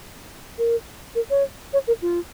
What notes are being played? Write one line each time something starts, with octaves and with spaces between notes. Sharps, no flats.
A#4
A#4
C#5
C#5
A#4
F4